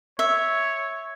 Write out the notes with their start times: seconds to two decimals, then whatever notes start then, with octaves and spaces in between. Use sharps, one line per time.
0.19 C#5 E5